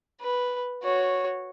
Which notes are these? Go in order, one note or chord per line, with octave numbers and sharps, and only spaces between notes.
B4
F#4 C#5